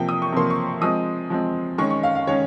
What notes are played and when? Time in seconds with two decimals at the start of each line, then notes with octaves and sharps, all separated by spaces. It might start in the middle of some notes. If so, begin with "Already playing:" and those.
Already playing: C3 F3 A#3 G5
0.09 D#6
0.22 C#6
0.32 C3 F3 A#3 C6
0.50 C#6
0.81 F3 G#3 C4 D#6
1.30 F3 G#3 C4
1.78 D#3 G#3 C#4 C#6
1.90 C#6
2.03 F5
2.15 F5
2.27 D#3 G#3 C#4 C#5